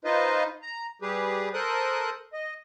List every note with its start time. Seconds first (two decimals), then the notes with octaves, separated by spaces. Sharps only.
0.05 D#4 F4 B4 C5 D#5
0.62 A#5
1.02 G3 G4 G#4 B4
1.54 A4 A#4 C5 D#6 F#6
2.33 D#5